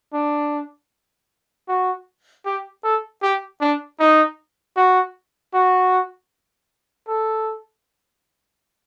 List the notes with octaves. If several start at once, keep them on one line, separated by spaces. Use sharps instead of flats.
D4
F#4
G4
A4
G4
D4
D#4
F#4
F#4
A4